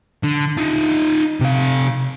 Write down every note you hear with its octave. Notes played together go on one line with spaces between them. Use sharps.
D3
D#4 F4
C3 F5